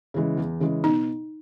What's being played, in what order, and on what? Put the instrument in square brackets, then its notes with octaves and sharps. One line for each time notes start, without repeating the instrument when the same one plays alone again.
[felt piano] C#3 E3 G#3
E2
C#3 E3 G#3
[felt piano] B2 [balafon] D#4